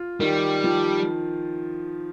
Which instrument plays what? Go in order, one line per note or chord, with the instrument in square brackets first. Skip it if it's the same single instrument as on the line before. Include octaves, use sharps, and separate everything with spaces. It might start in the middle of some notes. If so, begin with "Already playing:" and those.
Already playing: [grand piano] F4
[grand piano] D#3 [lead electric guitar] G3
[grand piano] F3